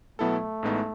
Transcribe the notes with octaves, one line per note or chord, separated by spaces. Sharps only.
B2 F#3 A3 B3 E4 A4
A1 A2 G#3 B3 D#4